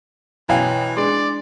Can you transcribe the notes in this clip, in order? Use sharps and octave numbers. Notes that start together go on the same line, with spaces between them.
B1 E3 C#5 F5 G5 G#5 A#5
G#3 D4 D5 C6